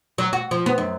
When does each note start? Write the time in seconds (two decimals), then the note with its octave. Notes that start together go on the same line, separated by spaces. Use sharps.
0.18 F#3
0.33 F#4
0.51 F3
0.66 B3
0.78 F#2